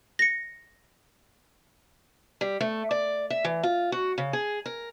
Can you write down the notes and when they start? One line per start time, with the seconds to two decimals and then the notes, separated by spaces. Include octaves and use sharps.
0.19 A#6 C#7
2.41 G3
2.61 A3
2.91 D5
3.30 E5
3.44 E3
3.63 F4
3.92 F#4
4.18 C#3
4.33 G#4
4.66 A#4